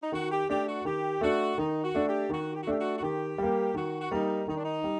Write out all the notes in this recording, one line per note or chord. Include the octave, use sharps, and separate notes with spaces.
D#4
D#3 F#4
G4
A3 D4 G4
F#4
D#3 G4
A3 D4 F#4
D#3 D#4
F#4
A3 D4
G4
D#3 F#4
G4
F#4
A3 D4 G4
F#4
F#4
D#3 G4
G3 A#3
D#3 F#4
F#4
G3 A#3 D#4
D#3 D#4
D4
D#4
G3